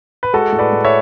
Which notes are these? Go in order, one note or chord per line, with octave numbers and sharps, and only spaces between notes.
B4
G#3 F#4 A4
A2
B4 D5
A2
C#5 E5